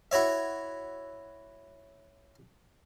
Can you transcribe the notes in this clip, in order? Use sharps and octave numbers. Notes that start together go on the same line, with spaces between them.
E4 F#4 C#5 E5